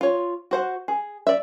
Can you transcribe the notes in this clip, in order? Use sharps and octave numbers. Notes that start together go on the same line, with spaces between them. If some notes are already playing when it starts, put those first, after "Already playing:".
F4 C#5
F#4 C5 F#5
G#4
D5 E5